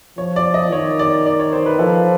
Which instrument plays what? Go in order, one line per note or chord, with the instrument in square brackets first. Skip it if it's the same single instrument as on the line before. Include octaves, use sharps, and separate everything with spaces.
[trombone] F3 [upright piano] C#5
[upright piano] D5
D#5
[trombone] D#3 [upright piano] C#5
[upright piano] D5
D5
C#5
C5
B4
[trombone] F3 [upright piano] A4